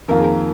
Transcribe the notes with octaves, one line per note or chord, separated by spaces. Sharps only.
F2 D#3 A#3 F4 A#4
G#4
A#4